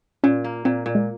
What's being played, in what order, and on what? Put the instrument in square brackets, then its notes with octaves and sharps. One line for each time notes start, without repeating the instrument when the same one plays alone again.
[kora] A#2 [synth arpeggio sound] C#4
[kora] A#3
[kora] A#2 [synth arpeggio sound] C4
[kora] A#2
[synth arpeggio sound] G#3